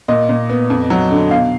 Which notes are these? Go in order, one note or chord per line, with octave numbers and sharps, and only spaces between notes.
A#2 D#5
A#2
B3
F2
F#3
D3
B2 F5